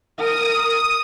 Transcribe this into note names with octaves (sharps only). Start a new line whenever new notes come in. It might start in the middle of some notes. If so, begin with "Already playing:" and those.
A#4 D#6